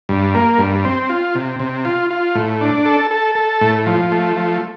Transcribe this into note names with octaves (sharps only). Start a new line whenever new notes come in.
G2
A#3
G2
C4
F4
C3
C3
F4
F4
A2
D4
A4
A4
A4
A2
F3
A3
F3